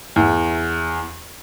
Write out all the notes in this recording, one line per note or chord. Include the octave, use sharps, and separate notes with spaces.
E2